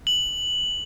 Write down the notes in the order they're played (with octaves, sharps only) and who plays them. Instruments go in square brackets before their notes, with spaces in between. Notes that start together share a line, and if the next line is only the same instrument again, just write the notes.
[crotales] F#7